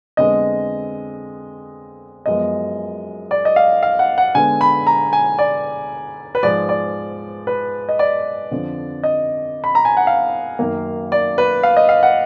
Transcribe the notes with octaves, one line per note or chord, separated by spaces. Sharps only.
F2 D3 G#3 B3 D#5
F#2 F3 G#3 B3 D#5
D5
D#5
F5
F5
F#5
F#5
D3 G#3 B3 G#5
B5
A#5
G#5
D5
B4
G#2 F3 G#3 D5
D5
B4
D#5
D5
F2 D3 F3
D#5
B5
A#5
G#5
F#5
F5
F#2 D#3 A#3
D5
B4
F5
D#5
F5
F#5